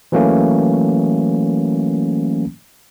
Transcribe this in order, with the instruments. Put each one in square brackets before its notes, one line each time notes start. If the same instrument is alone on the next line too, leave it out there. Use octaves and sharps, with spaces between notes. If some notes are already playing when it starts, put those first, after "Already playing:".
[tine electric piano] E3 F#3 A3 A#3 C#4